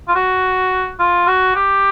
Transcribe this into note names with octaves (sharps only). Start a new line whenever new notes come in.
F4
F#4
F4
F#4
G4